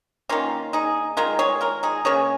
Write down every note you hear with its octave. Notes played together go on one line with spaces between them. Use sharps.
D#3 A#3 C#4 F4
D#4 G#4
D#3 G#3 F4 A#4
G#4 C#5
F4 A#4
D#4 G#4
C#3 A#3 G#4 C#5